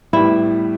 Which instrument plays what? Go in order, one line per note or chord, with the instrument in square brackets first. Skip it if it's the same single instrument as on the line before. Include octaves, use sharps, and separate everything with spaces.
[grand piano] A2 G3 B3 [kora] E4